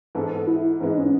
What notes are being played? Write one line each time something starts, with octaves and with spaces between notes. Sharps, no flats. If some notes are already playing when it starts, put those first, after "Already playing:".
G#2 E3 G#3 B3 A4
E4
G#2 E3 G#3 B3 E4
D#4
C#4